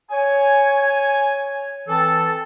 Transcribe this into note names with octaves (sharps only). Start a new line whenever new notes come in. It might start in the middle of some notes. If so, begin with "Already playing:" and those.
C#5 G#5
E3 C4 A4